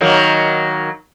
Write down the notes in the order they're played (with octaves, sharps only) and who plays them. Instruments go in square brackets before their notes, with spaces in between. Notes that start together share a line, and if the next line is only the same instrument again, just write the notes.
[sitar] D#3 F#3 A#3